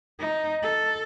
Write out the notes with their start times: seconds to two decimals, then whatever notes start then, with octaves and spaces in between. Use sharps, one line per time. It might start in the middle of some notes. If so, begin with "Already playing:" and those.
0.19 D#4
0.63 A4